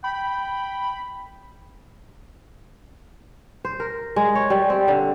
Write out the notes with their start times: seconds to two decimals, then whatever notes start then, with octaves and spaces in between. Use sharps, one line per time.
0.04 G5 B5
3.65 C5
3.80 A#4
4.16 G#3
4.35 C#5
4.50 G3
4.70 C4
4.88 D3